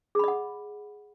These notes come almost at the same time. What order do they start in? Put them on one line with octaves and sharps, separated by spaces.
G#4 B5 D#5 F#5